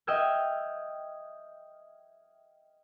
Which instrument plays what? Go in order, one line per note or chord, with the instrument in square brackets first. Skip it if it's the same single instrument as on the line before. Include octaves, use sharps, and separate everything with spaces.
[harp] D#5 E5 G5 E6 F6 G#6